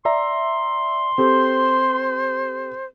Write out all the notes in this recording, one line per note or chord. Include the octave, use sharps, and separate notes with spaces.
D5 E5 A#5 C6
C4 G4 A4 C5